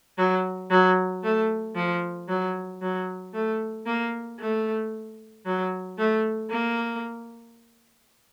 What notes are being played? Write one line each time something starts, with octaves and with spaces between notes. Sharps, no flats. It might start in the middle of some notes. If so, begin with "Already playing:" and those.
F#3
F#3
A3
F3
F#3
F#3
A3
A#3
A3
F#3
A3
A#3